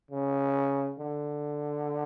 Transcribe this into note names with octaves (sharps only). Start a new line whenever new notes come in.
C#3
D3